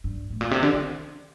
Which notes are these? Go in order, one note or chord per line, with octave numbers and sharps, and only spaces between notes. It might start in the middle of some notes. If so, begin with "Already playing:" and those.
G2
A2
A#2
C3
D3
D#3